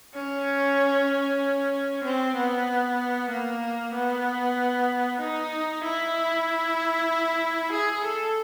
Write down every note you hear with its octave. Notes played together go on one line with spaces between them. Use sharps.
C#4
C4
B3
A#3
B3
D#4
E4
G#4
A4